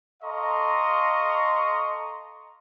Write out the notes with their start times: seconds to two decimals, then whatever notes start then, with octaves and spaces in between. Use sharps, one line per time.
0.23 A4 D#5 F5 A#5 C6 C#6